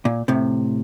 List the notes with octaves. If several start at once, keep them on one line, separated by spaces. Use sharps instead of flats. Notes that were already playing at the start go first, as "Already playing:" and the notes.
A#2
A2 C3